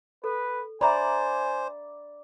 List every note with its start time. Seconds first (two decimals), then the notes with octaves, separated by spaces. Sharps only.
0.24 A4 B4
0.81 C5 D5 E5 G#5 A#5 B5